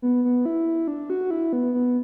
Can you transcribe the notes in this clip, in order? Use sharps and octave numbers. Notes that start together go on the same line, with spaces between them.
B3
B3
E4
D4
F#4
E4
B3
B3